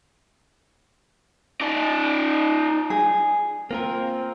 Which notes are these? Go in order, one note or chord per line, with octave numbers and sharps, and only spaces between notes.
D#4 D5
G#4
A#3 C4 F4 A#4